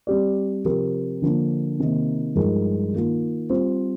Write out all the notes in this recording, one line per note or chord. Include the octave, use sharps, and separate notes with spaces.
G3 C4 G4 D5
C3 F3 C4 G4 A#4
D3 F3 A#3 D4
C3 D#3 A#3 D#4
G2 F3 G#3 D#4 A#4
D#3 A#3 F4
G3 C4 F4 C5